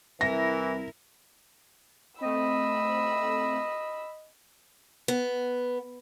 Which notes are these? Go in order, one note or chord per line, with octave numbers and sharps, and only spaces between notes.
C2 E3 E4 A#4 A#6
A3 C4 D#5 B5 E6
B3